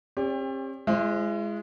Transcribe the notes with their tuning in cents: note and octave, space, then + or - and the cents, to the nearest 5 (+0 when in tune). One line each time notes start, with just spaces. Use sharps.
C4 +45 G4 +30 D5 -30
G#3 +0 E4 +40 C5 +30